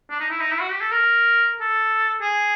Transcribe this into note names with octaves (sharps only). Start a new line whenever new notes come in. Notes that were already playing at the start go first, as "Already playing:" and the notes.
D4
D#4
E4
D#4
E4
F#4
G4
A4
A#4
A4
G#4